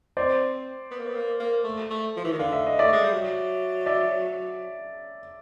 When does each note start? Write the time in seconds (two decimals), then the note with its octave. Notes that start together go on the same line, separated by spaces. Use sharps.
0.17 C4 C5 D5
0.91 B3
0.99 A#3
1.07 B3
1.15 A#3
1.40 A#3
1.64 A3
1.90 A3
2.17 F3
2.25 E3
2.32 D#3
2.39 D3 F5
2.53 E5
2.66 D#5
2.79 A3 D5 E5
2.93 G#3
3.03 G3
3.13 F#3
3.86 D5 E5